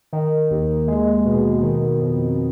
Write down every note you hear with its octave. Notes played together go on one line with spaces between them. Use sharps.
D#3
D#2
G#3
B2
D#3
F2